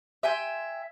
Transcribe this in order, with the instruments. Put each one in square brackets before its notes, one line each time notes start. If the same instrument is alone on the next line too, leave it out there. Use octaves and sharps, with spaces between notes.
[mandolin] E5 G5 G#5 C6